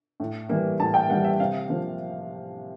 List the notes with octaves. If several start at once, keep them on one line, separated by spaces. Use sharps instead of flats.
A2
E3 G3 A#3
A2 A5
G5
E3 G3 A#3 F#5
E5
C3 F5
F3 A#3